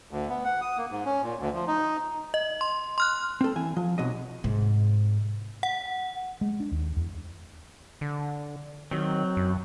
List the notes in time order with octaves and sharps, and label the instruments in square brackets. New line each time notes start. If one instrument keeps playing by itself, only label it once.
[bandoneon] D2
B3
F#5
D#6
A#3
G#2
C#4
A#2
D2
F3
D#4
[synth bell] D#5
C6
C6 F6 F#6
[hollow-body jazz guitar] C4 A4
E3 G#5
F3
B1 C3 F#3 D#5
[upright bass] G#2 C3
[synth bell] F#5
[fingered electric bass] G#3
D4
D#2
E2
[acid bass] D3
[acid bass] D#3 [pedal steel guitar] F#3 C4
[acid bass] F#2